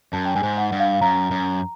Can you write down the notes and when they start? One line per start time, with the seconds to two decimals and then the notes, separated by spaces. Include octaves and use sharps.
0.13 F#2 A5
0.25 G5
0.35 G2 G#5
0.43 G#2
0.58 F#5
0.72 G2
0.80 F5
1.01 F#2 A#5
1.31 F#2